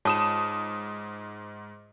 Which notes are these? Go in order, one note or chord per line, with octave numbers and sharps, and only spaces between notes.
G#2 F4 C#5 A5 D#6 E7